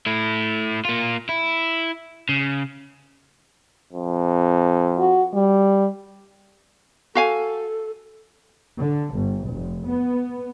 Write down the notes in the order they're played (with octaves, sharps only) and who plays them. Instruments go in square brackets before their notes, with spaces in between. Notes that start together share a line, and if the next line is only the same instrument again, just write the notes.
[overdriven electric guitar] A3 E4
A#3 F4
E4
C#3
[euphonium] F2
[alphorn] F#4
G3
[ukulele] F#4 F5 G#5 [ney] A4
[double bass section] D3
G1
F1
B3